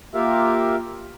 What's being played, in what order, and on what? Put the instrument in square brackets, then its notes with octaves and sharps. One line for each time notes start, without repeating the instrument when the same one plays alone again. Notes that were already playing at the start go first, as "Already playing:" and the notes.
[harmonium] A#3 F4 G4 A#4 E5 F5